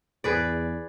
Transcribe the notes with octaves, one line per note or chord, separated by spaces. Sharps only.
E2 G#4 B4 D5